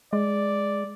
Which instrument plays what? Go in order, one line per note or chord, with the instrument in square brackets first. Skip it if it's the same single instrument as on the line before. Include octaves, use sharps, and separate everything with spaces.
[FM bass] G#3 [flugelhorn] D5